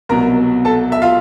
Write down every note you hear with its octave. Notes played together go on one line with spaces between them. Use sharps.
C2 B2 F#3 A#4 A#5
A4 A5
E5
F4 F5